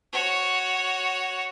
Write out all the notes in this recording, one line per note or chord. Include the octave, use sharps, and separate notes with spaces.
F#4 C#5